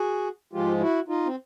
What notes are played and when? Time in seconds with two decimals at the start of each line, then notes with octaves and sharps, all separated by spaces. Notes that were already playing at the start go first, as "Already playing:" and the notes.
Already playing: F#4 G#4
0.53 G#2 F3 G#3 F4 G4
0.80 E4 F#4
1.08 D#4 F4
1.26 C4